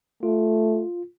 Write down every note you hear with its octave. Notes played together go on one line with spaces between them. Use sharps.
A3 F4